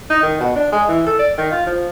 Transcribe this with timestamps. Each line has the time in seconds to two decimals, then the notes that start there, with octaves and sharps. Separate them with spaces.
0.10 D#4
0.22 D#3
0.40 B2
0.55 D4
0.72 G#3
0.88 E3
1.06 A4
1.19 D5
1.38 D#3
1.52 F4
1.66 F3